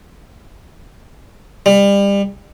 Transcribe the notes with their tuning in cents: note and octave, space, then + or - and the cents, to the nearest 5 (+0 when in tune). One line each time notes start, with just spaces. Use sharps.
G3 +30